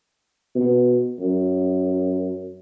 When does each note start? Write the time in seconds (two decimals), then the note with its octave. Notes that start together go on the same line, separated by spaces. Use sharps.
0.56 B2
1.20 F#2